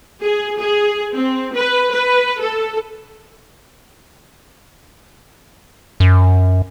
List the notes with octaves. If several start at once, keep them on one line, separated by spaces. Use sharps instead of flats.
G#4
G#4
C4
B4
B4
A4
F#2